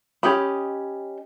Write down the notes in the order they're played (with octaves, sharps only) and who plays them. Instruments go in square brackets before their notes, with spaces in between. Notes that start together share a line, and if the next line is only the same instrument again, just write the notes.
[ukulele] C#4 G4 D#5 B5